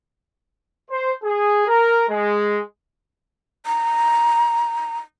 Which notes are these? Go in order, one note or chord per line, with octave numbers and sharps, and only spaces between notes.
C5
G#4
A#4
G#3
A#5